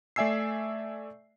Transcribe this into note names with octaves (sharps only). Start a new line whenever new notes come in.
A3 D5 E5 G#5 E6 C7